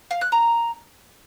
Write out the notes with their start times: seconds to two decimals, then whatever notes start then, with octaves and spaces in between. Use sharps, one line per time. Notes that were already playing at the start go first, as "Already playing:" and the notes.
0.11 F5
0.21 F#6
0.32 A#5